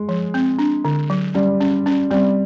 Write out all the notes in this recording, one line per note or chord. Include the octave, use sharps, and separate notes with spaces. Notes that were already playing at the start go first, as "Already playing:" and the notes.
Already playing: G#3
F3
C4
D4
D3
F#3
G3 C#4
C#4
C#4
G3 C4